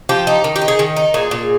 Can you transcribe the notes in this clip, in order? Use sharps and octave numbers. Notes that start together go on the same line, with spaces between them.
F3 G4
D#4
D#3
G4
D#4
G#4
D#3
D#4
A#2 G#4
A#2